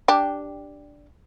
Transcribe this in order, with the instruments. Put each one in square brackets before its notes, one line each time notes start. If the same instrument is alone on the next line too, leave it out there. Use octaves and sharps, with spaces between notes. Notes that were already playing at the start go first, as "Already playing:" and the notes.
[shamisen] D4 G4